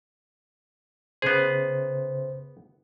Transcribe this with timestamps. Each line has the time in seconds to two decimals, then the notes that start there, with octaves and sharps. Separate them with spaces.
1.22 C#3 B3 G#4 C5